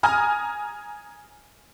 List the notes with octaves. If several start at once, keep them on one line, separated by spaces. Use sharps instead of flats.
G#5 A#5 D#6 F6